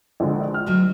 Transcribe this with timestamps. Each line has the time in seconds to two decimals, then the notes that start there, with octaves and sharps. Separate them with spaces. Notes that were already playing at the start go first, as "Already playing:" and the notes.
0.20 A#1 D3 G#3
0.54 F6
0.66 D2 F#3 G#3